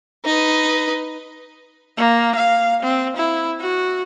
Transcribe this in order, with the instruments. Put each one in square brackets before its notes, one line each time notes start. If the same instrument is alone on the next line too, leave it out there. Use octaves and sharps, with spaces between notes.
[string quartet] D#4 B4
[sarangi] A#3
F5
C4
E4
F#4